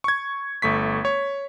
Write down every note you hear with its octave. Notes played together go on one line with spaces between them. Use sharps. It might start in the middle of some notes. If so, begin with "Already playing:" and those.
C#6 G#6
G1 A3 C#6 B6
C#5